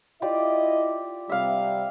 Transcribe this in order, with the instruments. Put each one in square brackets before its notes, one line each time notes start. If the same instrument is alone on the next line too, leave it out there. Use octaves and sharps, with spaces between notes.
[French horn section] E4 D#5 [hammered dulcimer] F4 G4 D5
[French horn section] C3 G3 [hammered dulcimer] E5 F5